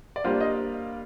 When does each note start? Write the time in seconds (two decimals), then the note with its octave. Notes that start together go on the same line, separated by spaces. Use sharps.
0.16 D5
0.24 G3 A#3 D4 F4 C5
0.40 D#5